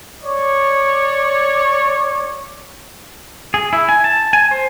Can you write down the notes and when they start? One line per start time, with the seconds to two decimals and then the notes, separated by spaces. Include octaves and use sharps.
0.23 C#5 D5
3.54 G#4
3.73 E4
3.89 G#5
4.04 A5
4.33 G#5
4.51 C5